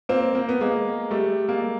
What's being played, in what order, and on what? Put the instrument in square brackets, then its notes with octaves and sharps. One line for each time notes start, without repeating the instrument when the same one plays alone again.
[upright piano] A#3 C4
A#3
B3
G#3 A#3
G3 A3
G#3 A#3